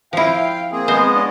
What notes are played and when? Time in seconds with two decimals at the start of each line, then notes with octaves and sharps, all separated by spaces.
0.13 F3 E4 F5 G5
0.72 A#3 C4 G#4
0.88 G#3 B3 C5 D#5
1.16 D4 C#5 D5